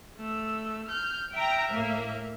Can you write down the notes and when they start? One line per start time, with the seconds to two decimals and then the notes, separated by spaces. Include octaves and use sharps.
0.17 A3 E6
0.89 F6 G6
1.34 E5 G5 A#5 F6
1.73 A2 A#3